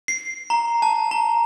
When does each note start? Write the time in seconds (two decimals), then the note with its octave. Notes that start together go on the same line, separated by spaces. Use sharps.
0.08 C7
0.50 A#5
0.82 A5
1.11 A#5